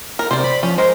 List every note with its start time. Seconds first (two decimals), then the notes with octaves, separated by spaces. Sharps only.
0.19 A#4
0.31 C3 C5 D5
0.44 B5
0.63 F3 C#4
0.78 G#3 A#4 C5